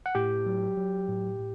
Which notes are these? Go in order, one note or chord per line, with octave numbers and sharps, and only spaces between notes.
F#5
A2 G4 G5
F#3
F#3
A2
A2